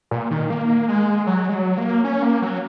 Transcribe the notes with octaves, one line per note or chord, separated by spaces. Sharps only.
A#2
D#3
A#3
G#3
F#3
G#3
F#3
A#3
C#4
A#3
F#3